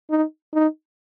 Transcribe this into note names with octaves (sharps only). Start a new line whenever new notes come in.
D#4
D#4